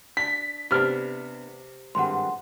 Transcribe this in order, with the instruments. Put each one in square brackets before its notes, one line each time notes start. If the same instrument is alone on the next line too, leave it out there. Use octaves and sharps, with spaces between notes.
[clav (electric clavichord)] D4 [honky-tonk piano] B6
[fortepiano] C3 F6 [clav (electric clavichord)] B3 D4
[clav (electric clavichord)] G#1 G2 [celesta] F#5 C6